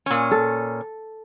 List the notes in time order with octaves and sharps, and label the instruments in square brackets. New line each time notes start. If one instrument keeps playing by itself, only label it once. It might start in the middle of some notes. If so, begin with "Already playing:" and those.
[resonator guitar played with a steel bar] A#2 C#4
[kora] A4